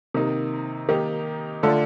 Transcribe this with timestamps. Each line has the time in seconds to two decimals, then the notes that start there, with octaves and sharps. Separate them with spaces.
0.14 C3 D#3 A#3 D#4
0.89 D#3 A#3 D#4 G4
1.63 D3 A3 D4 F4 A4